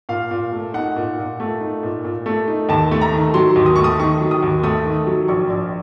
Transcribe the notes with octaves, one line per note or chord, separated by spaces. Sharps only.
A#2 F5
A#2
A3
D#4 F#5
A#2
A#2
A3
D#4
A#2
A#2
A3
D#4
D#2 A5
A3
A#5
D#3
F#3 C6
D#2
D#6
A3 C#6
D#6
D#3 C#6
F#3
D#6
D#2
A3 D#6
D#3
F#3
A#1 C#6
A#1